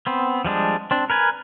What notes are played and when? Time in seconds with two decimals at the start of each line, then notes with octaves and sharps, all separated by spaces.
0.07 B3 C4
0.45 F3 G3 G#3 D4
0.91 C4 D4
1.10 A#4 B4 G#5